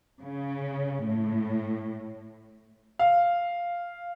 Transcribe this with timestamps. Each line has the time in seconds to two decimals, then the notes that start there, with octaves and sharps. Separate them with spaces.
0.21 C#3
1.04 A2
2.99 F5